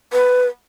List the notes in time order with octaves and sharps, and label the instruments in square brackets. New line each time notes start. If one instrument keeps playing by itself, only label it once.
[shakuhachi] B4